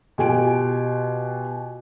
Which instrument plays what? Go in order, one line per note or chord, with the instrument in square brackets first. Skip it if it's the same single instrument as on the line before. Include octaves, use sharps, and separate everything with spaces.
[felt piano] B2 F4 G4 G5 G#5 D7